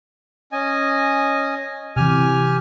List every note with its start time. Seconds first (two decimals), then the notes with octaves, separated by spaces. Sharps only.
0.52 C#4 D#5 G#5
1.96 C3 E3 G4 G#5 F6